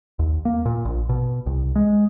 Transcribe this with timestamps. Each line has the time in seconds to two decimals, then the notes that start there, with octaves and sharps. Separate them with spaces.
0.19 D#2
0.45 A#3
0.66 A#2
0.85 A#1
1.09 B2
1.46 C2
1.76 G#3